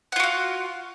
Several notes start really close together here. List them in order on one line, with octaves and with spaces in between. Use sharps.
F#5 F4 F#4 F5